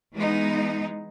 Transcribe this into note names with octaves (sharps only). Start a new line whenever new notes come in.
E3 G#3 B3 D#4